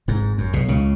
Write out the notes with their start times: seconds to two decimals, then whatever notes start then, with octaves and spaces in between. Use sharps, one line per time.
0.08 G#1 G#2
0.38 F#2
0.53 B1 B2
0.68 C#2 C#3